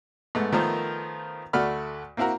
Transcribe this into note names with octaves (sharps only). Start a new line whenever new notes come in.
G#2 A3 B3
D#3 F3 A3 B3 A#4 C5
D2 A3 F#4 D5 B5 F6
A#3 C4 E4 F#4 A#4